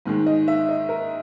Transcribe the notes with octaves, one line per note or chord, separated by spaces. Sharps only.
G#2 D#3 G#3
D#5
E5
D#5
A#4